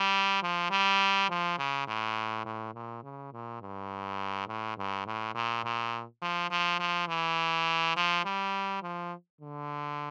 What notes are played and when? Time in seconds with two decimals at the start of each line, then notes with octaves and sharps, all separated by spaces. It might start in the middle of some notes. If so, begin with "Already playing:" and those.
Already playing: G3
0.43 F3
0.71 G3
1.30 F3
1.58 C#3
1.87 A2
2.45 A2
2.74 A#2
3.03 C#3
3.33 A#2
3.61 G2
4.48 A2
4.77 G2
5.07 A2
5.34 A#2
5.64 A#2
6.22 F3
6.51 F3
6.80 F3
7.08 E3
7.97 F3
8.25 G3
8.83 F3
9.41 D3